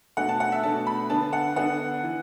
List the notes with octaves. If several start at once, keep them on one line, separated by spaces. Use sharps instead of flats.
B2 A3 D4 F#5
A5
F#5
E5
B2 A3 D4 A5
B5
D3 B3 D4 A5
F#5
D3 B3 D4 F#5
E3